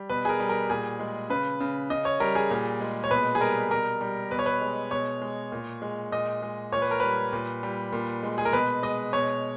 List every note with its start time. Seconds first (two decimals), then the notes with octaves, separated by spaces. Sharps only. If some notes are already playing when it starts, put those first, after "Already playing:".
Already playing: G3
0.09 B2 B4
0.25 G#4
0.29 A#4
0.40 G3
0.49 A#4
0.70 A#2 G#4
1.00 G#3
1.30 C#3 B4
1.60 C#3
1.90 C#3 D#5
2.05 C#5
2.20 G3 A#4
2.35 G#4
2.50 A#2
2.81 G#3
3.04 C#5
3.11 B2 B4
3.35 G#4
3.41 G3 A#4
3.71 B2 A#4
4.01 G3
4.31 B2 B4
4.39 C#5
4.46 B4
4.61 G#3
4.91 B2 C#5
5.22 G#3
5.52 A#2
5.82 G#3
6.12 A#2 D#5
6.42 G#3
6.72 A#2 C#5
6.82 B4
6.91 A#4
7.00 G3 B4
7.33 A#2
7.63 G3
7.92 A#2
8.23 G#3
8.38 G#4
8.45 A#4
8.53 B2 B4
8.83 G#3 D#5
9.13 B2 C#5